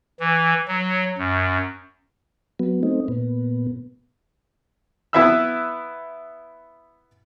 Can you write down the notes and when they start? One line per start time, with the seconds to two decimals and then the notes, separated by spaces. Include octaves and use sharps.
0.20 E3
0.68 F#3
1.18 F#2
2.59 F#3 B3
2.83 A3 C4 D#4
3.08 A#2 B3
5.13 B3 E4 B4 E5 B5 E6